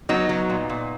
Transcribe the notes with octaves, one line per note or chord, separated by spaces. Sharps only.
F#3 B3 D#4
F#3
A#2
A#2